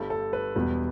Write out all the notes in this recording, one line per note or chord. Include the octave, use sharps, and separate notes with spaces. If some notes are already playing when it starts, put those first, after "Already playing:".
Already playing: G1 G2 G3 A4
A4
B4
E1 E2 B2 G3 B3